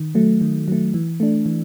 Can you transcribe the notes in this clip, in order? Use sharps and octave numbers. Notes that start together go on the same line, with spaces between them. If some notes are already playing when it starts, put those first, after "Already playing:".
Already playing: D#3
F#3 A3
D#3
F#3 A3
E3
A3 D4
E3